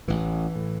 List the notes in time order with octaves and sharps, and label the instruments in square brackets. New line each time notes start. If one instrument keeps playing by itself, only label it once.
[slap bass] A1 A2 E3
A2